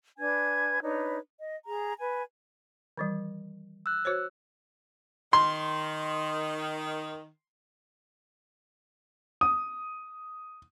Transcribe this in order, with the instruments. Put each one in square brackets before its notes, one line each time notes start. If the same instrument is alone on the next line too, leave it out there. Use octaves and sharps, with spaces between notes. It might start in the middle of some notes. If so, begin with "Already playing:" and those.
[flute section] D4 B4 G#5 G#6
D4 D#4 B4 C#5
D#5
G#4 A#5
B4 G#5
[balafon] D#3 E3 G3
[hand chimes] E6 F#6
[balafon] F#4 C5 C#5
[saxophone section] D#3 [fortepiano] C6
[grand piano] D#6